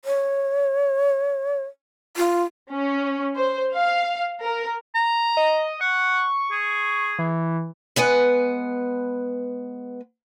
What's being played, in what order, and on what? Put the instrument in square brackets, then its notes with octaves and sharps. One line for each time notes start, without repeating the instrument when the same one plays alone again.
[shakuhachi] C#5
F4
[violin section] C#4
C5
F5
A#4
[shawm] A#5
[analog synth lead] D#5
[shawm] F#5 [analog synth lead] C#6
[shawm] G#4
[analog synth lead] E3
[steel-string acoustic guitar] G#3 B3 B4 F#5 G#5